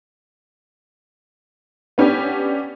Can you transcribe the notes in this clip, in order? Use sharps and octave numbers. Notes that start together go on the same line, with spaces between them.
B3 C#4 D4 G4